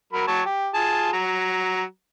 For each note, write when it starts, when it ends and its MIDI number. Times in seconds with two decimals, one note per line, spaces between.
0.13 0.27 54
0.13 0.27 70
0.13 0.27 83
0.28 0.42 54
0.28 0.42 73
0.28 0.42 81
0.46 0.68 67
0.74 1.10 65
0.74 1.10 68
0.74 1.10 81
1.13 1.83 54
1.13 1.83 82